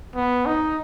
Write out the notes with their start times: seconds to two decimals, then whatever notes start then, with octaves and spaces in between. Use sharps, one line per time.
0.16 B3
0.46 D#4